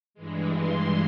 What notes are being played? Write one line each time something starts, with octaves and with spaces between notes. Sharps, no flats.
G2 E3 G#3
C6